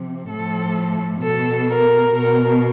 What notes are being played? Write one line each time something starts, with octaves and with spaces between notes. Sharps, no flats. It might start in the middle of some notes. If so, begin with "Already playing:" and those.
Already playing: C3 F3
A2 F3 A4
B2 A4
A#4
B2 A#4